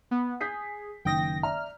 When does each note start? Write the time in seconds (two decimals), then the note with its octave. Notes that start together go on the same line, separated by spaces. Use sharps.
0.11 B3
0.40 G#4 G6 B6 C7
1.05 F#1 D#3 G5 D#6 A#6
1.43 D5 E5 A#5 F6